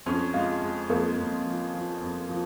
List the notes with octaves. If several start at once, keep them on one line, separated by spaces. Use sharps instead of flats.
F2 C#4
G#3 F4
G#3
F2 A#3
F2
F3
F3
F2
F3